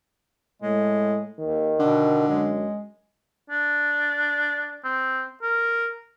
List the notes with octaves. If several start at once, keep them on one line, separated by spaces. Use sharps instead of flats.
A2 G#3
D#2 D#3
B2 D3
F#2 G#3
D4
C4
A#4